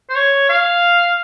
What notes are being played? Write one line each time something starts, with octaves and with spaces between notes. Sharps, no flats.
C5
C#5
F5